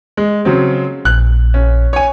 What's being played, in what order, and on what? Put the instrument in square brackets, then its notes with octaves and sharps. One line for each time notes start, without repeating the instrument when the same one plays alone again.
[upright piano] G#3
C#3 F#3 C4
[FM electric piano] A#1 [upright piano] F#6
[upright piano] C#4
C#5 G#5